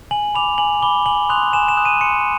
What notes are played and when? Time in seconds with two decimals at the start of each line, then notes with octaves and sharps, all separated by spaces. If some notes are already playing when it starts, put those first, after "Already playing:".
0.11 G#5 F#7
0.35 B5 D6 F7
0.58 G#5 F#7
0.82 B5 D6 G7
1.06 G#5 F#7
1.29 C6 D#6 F#6 F7
1.53 G#5 E7
1.68 E7
1.77 C6 D#6 F#6
1.85 D#7
2.01 C6 C#7